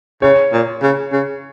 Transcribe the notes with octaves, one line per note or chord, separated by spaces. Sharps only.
C#3 C#5
A#2
C#3
C#3